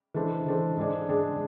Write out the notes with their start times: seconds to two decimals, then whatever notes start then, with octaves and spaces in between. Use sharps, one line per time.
0.14 E3 G#3 D4 A4 C5
0.46 E3 G#3 D4 A4 C5
0.77 G#2 G#3 D4 G#4 D5
1.09 G#2 G#3 D4 G#4 D5